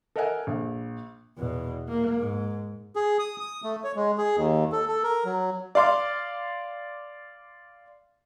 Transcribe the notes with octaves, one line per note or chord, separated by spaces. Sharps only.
A4 A#4 D#5 E5 F#5 G#5
A#1
E2 B2
A#3
G#2
G#4
D#6
D#6
A3
C#5
G#3
G#4
D#2
A4
A4
A#4
F#3
D5 F5 C6 D6